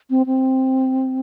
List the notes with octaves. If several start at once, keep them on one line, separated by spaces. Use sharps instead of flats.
C4
C4